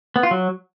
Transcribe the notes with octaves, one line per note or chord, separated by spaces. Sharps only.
B3
F4
F#3